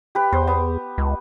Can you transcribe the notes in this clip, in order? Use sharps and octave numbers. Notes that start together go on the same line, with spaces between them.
G4 B4
E2 C5
B3
C#2